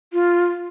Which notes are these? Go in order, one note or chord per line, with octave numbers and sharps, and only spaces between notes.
F4